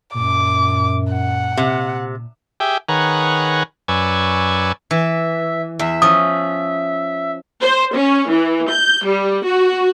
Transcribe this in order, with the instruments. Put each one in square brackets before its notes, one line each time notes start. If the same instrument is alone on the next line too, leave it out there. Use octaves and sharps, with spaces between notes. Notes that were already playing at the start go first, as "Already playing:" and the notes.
[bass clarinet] F#2 [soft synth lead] A#2 [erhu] D6
[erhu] F#5
[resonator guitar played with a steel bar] C3
[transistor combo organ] G4 G#4 E5 G5
D#3 G#4 B4 C#5 F#5 A#5
F#2 B4 D5 G#5 C#6 E6
[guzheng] E3 [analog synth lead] E5
[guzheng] E2 [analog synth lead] E5
[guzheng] F3 C#4 [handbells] D#6
[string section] C5
C#4
E3
G6
G3
F#4